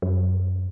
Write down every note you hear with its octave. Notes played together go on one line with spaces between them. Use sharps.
F#2